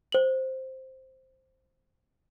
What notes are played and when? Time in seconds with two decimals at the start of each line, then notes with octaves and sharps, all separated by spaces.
0.12 C5 F#7